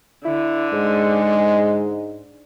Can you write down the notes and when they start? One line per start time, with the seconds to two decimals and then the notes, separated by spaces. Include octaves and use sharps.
0.25 D3 E4
0.73 G#2 G#3